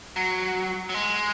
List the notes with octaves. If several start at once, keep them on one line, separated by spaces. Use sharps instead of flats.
F#3
F#3
G#3